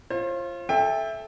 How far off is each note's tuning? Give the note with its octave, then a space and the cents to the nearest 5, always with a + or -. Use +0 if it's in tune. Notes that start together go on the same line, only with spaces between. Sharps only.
F4 -20 C5 +40
A4 -15 E5 +0 G5 +25